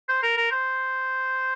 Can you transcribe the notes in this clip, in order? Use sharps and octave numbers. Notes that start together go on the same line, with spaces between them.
C5
A#4
A#4
C5